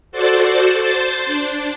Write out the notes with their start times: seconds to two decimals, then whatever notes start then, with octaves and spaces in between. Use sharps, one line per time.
0.12 F#4 A4 C5 D5 A5
0.81 C5 A6
1.26 D4